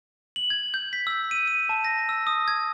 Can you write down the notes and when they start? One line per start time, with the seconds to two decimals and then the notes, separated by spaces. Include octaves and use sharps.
0.36 F#7
0.50 G#6
0.74 G6
0.93 B6
1.07 E6
1.31 D#7
1.48 D#7
1.69 A5
1.85 A#6
2.09 E6
2.27 D#6
2.48 G#6